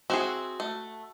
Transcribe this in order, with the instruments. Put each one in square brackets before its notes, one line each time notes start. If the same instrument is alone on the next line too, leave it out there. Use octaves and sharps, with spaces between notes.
[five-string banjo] C4 E4 G#4 [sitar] F#4
[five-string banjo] A3